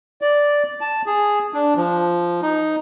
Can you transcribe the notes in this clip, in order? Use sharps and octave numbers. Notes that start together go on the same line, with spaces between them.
D5
A5
G#4
D4
F3
D#4